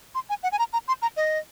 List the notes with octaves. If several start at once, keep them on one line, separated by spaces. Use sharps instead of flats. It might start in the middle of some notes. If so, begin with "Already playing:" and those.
C6
G#5
F#5
G#5
A#5
A#5
C6
A#5
D#5